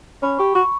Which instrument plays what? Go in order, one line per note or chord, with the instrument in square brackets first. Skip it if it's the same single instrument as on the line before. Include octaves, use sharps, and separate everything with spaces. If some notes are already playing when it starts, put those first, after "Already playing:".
[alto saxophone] C#4 [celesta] B5
[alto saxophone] G4 [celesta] C#6
[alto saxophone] F#4 [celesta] C#6